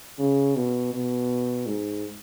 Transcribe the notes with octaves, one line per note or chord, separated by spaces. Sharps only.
C#3
B2
B2
G#2